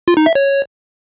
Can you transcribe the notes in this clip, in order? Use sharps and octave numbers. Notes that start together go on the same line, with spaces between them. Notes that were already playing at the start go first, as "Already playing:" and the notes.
F4
D#4
E5
C#5